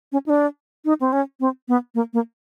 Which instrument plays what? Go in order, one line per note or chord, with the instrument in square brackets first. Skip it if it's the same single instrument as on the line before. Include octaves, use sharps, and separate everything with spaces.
[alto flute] C#4
D#4
D4
D#4
C4
C#4
C4
B3
A#3
A#3